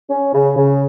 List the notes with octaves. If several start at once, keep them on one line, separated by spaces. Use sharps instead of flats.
C#4
C#3
C#3